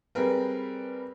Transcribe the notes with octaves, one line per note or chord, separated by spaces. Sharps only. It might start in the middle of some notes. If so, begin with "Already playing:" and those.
G3 C4 G#4 A#4 B4